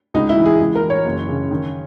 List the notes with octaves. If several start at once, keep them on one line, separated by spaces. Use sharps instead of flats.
C#2 D#4
E4
E3
G#4
C#2
A#4
E3
C#5
F#1
C#3
D#3